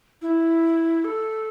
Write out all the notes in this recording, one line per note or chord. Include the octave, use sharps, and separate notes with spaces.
E4
A4